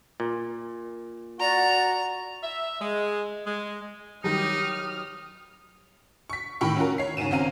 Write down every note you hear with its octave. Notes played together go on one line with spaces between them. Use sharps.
A#2
F#4 D5 A#5
E5
G#3
G#3
D#3 F#3 G3 D#4 G4 D#6 F6
C#6 B6
A2 D#3 G5 B5 C#6
C#4 F4 F#4 A#4
C#5 C7
G#2 C#3 C#4 D#7 E7
G#1 C4 C#4 F5 A#5 D#7